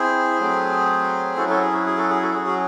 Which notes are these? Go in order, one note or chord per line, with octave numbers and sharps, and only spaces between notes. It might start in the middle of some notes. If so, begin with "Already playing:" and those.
Already playing: C4 E4 G#4 C5
F#3 A3 C4
F#3 C#4 E4 F#4 A4
F#4 A4
G#4
F#4
G#4
F#4 A4
G#4
F#4 A4
F#3 C#4 F#4 G#4
F#4